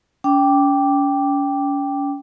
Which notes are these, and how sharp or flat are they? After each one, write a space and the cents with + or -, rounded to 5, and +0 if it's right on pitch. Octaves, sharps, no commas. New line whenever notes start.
C#4 +40 G5 +0 D6 -5